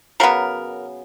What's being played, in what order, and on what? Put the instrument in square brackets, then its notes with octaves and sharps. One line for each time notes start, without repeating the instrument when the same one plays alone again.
[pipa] C#3 F#3 B3 A#4